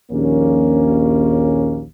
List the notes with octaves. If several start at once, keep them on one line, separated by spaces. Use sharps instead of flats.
A#1 D#2 A#3 C#4